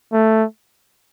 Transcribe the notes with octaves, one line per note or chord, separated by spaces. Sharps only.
A3